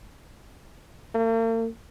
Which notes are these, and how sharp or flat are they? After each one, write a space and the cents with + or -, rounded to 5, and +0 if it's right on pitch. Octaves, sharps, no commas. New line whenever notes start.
A#3 -45